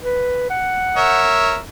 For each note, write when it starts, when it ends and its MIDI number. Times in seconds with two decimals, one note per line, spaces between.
0.02 0.46 71
0.50 1.36 78
0.96 1.57 70
0.96 1.57 73
0.96 1.57 76